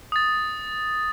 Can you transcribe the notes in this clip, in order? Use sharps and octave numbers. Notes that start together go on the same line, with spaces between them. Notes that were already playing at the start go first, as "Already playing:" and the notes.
D#6 A6